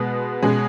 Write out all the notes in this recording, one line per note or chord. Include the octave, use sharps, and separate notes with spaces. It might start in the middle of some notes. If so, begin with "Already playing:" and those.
Already playing: B2 G#3 B3
B2 G#3 C#4 G#4